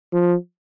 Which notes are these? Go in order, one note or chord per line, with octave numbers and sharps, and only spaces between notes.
F3